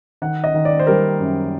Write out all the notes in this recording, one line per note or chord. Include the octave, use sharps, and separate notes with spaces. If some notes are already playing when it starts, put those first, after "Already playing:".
D#3 F#5
D#5
D#3
D5
C5
G3 A#4
F#2